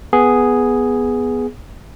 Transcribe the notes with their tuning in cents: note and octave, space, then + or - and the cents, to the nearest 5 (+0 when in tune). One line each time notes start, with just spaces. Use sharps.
B3 +0 G#4 +0